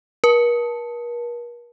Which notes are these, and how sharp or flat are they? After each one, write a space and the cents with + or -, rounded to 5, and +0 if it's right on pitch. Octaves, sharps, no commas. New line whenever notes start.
A#4 +45 A5 +0